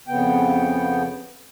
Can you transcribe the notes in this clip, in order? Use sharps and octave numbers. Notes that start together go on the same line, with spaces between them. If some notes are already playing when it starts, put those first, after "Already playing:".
F2 C#3 B3 G5